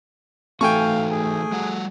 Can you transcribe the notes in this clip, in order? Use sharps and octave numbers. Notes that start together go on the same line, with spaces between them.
E3 A3 D#4 F#4 F5 G5 G#5 C#6
G#4
G3 F#4 F#5